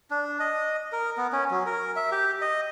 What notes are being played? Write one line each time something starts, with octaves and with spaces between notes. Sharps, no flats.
D4
D#5
A#4
B3
C#4
F#3
A#4
E5
G4
D#5